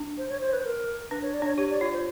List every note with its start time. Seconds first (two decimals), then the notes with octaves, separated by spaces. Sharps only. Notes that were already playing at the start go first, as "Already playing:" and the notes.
Already playing: D4
0.18 C5
0.29 C#5
0.41 C5
0.53 B4
0.64 A#4
1.11 D4 B4
1.22 C#5
1.34 D5
1.42 D4 C#5
1.57 G4 C#5
1.70 D5
1.80 F4 C#5
1.93 C5